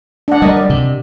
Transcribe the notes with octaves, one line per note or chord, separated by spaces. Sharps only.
D4 F#5
G3 A#4 D#5
D5
C3